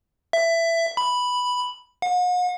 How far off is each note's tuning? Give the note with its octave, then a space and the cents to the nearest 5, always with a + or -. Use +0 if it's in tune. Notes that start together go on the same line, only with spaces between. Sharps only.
E5 +15
B5 +0
F#5 -45